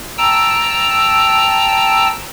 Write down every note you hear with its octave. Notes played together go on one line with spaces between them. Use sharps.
G5 A5 A#5 E6